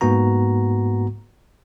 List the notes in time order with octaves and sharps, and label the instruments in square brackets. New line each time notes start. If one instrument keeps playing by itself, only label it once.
[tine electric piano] G#2 A#3 B3 F#4 A#5